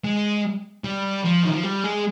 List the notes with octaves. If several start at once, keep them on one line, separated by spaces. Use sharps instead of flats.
G#3
G3
F3
D#3
F3
G3
G#3